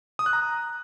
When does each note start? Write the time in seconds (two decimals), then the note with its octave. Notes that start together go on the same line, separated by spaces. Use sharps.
0.19 D#6
0.26 F#6
0.33 A#5